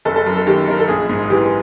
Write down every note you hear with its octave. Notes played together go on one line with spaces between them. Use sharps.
F#1 A4
A4
F#2 A#4
A4
D#3 G4
F#1 A#4
A4
A#1 G#4
G#2
E3 G4